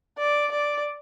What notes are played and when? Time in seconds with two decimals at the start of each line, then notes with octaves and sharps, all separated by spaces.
0.18 D5
0.51 D5